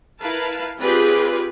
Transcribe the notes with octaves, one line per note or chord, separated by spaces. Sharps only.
E4 A#4 B4 F5 A5
C4 F4 G4 G#4 B4 D5